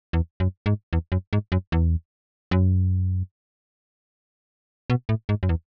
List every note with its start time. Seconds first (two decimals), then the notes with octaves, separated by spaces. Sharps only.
0.13 E2
0.40 F#2
0.66 G#2
0.93 E2
1.12 F#2
1.33 G#2
1.52 F#2
1.72 E2
2.51 F#2
4.90 B2
5.09 A2
5.29 G#2
5.43 F#2
5.49 E2